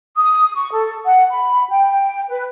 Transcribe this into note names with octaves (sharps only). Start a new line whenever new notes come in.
D#6
C#6
A4
F#5
B5
G5
B4